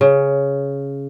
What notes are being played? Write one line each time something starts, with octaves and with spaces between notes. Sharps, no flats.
C#3